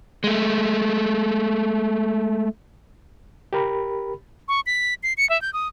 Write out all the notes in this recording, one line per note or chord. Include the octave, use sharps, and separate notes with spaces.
G#3 A3
G4 A#4 B5
C#6
B6
C7
C#7
E5
G6
D#6